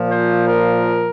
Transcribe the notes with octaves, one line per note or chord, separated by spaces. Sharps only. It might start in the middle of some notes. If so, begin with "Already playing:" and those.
Already playing: A#2 F3
C5
A#4